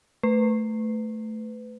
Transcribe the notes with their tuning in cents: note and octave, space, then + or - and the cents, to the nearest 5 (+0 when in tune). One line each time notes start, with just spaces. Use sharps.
A3 +0 B4 +25